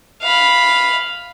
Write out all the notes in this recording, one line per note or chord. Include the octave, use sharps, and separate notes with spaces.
F5 B5